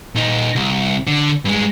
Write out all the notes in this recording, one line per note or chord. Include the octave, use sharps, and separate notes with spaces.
A#2 D#4
C2
D3
G2 G#3